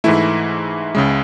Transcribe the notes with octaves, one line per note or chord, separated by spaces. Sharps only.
G#2 E3 A3 E4
C#2 C#3 G#3